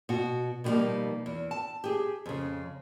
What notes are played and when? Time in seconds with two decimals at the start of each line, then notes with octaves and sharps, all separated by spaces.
0.09 B2 F#4
0.64 B2 D3 D#3 F3 G3 A#3
1.26 E2
1.51 A5
1.84 G4 G#4
2.26 F2 C#3